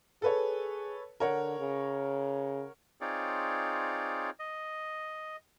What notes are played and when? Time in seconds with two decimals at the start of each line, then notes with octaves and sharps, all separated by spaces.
0.22 G#4 A4 B4 C#5
1.20 D3 A#4 C#5 F#5
1.59 C#3
3.01 C4 D#4 F4 G#4 C#5 D5
4.39 D#5